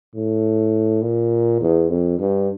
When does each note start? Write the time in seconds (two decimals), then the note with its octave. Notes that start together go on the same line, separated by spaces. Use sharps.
0.16 A2
1.02 A#2
1.61 E2
1.89 F2
2.19 G2